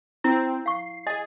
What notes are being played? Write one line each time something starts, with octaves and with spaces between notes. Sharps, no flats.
C4 E4
F5 C#6 C7
G#4 D#5